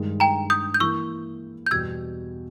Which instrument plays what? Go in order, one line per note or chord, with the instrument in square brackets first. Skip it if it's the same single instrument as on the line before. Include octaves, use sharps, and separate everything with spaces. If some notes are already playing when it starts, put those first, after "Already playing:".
Already playing: [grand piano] G2 D#3 G#3
[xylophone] G5 A#5
D#6 G6
G6
[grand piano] E3 A#3 E4 [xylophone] C#6 E6
[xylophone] G6
[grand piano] E2 B2 G3 [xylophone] E6 G#6